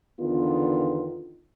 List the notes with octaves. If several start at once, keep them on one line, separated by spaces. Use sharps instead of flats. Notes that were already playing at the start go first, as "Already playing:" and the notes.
E2 D3 D#3 B3 F4